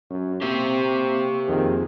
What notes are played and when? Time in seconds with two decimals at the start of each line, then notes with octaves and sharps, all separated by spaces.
0.11 F#2 C#4
0.42 A#3 C4 G4 C5 E5 C#6
1.48 F2 D#3 C4 G#4